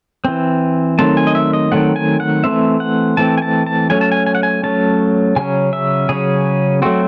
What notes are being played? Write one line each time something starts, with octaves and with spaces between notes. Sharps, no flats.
E3 C4
D#3 F#3 A3 C4 A5
G#5
D#5
E5
D#5
D#3 F#3 A3 C4 F#5
G#5
F#5
E3 A3 C4 E5
F#5
E3 A3 C4 A5
G#5
A5
A5
F#3 A3 C#4 G#5
A5
G#5
G#5
F#5
G#5
F#3 A3 C#4 A5
C#3 F#3 C#4 G#5
E5
C#3 F#3 C#4 G#4
F#3 A3 C4 F#4